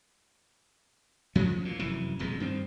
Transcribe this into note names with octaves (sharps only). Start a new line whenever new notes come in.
F#2 F3 G#3 C#4
E2 A#2
F1 F#2 E3
D#1 F2 B2 G#3
G2 D#3 C4